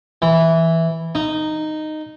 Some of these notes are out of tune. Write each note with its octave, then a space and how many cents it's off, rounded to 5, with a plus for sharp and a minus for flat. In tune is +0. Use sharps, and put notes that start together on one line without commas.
E3 -5
D#4 -10